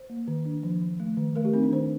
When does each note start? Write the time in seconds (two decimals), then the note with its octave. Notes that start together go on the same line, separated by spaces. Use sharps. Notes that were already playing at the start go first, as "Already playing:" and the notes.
Already playing: C5
0.10 A#3
0.28 D#3
0.45 D4
0.63 F3
0.82 F3
1.00 A3
1.17 D#3
1.35 A3 A#4
1.45 G4
1.53 C4 D#4
1.64 D4
1.71 D#3 C5